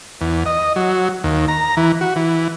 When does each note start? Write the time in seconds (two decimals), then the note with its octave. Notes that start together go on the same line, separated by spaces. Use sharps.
0.21 E2
0.46 D#5
0.76 F#3
1.24 D#2
1.48 A#5
1.77 E3
2.01 F#4
2.16 E3